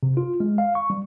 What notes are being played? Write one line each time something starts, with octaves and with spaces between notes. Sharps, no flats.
C3
F4
G#3
F5
C#6
G3